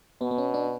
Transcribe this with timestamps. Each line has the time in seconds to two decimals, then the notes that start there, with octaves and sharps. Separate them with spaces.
0.21 B2 B3
0.31 B3
0.38 C#4
0.54 D4